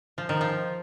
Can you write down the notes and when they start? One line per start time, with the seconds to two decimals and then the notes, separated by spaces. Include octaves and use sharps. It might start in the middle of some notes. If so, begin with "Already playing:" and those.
0.18 F3
0.29 D#3
0.41 F3